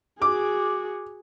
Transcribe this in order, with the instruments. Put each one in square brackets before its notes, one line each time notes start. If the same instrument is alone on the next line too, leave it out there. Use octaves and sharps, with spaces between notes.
[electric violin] F#4 G#4 [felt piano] D6